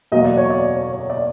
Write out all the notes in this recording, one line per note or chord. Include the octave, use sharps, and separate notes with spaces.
E2 B2 F#3 A#3 D#5
D5
C#5
D5
C#5
C#5
D5